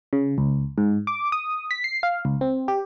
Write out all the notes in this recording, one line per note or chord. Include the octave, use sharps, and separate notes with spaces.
C#3
C#2
G#2
D6
D#6
B6
C7
F5
C#2
C4
G4